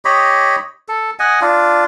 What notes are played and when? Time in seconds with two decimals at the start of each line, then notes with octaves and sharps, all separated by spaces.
0.05 G4 C#5 D#5 B5
0.88 A4
1.19 D#5 F#5 G#5
1.41 D4 F4